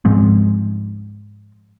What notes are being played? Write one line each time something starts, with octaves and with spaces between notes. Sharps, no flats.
G#2 F3 G#3 C4